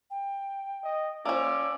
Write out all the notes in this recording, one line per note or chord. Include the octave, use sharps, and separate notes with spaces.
G5
D#5
F3 A#3 C#4 D5 E6